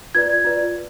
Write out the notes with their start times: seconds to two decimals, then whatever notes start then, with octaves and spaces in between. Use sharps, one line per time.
0.15 F4 B4 D5 G#6
0.45 F4 B4 D5